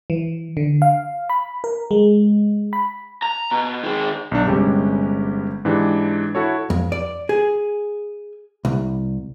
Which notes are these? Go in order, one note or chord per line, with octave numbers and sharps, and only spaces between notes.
E3
D3
F5
B5
A#4
G#3
B5
A#5
B2
D#3 G#3
B1 D4
G1 C3 G3 G#3 C#4 G4
G#2 E3 D4 G4
E4 F#4 A4 C#5
F2
D5
G#4
C2